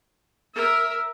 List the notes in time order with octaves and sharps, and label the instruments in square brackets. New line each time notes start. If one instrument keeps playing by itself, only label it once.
[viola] A#4 E5